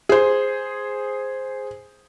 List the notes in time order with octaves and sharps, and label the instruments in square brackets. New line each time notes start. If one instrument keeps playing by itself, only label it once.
[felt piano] G#4 C5